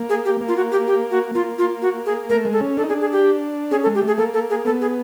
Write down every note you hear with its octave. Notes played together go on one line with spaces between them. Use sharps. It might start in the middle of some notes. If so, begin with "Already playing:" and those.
Already playing: A#3
G#4
G4
A#3
F4
F#4
G4
G4
F#4
A#3 F4
F4
F#4
G#4
A3 A#4
G#3
A4
C#4
D4 A4
D#4
D4 G#4
G#4
G4
C#4 G#4
A4
G#3
G4
A3
G#4
A#3 A4
A4
G#4
B3 A4
G#4